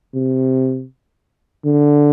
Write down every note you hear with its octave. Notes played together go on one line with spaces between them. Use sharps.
C3
D3